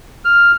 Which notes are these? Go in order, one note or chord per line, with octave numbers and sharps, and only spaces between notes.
F6